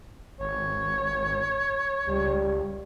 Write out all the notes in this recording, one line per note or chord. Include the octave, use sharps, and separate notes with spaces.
G#1 C#5
C#2 G3